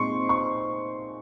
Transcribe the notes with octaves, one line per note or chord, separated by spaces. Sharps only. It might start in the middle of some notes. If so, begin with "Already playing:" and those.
Already playing: A#2 G#3 C4 D#4 C6 C#6
C#6